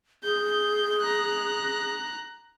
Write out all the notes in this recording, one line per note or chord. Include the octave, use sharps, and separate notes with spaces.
G#4 G6
A#5 F#6